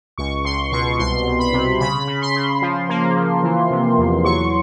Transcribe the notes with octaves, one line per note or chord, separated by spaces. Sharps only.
C#2 C#6
C#2 C6
B2 C#6
C2 C6
C2
B5
C3
C#3 B5
C#3
C6
C#3
F3
A#3
F3
E3
C3
E2
F#3 C#6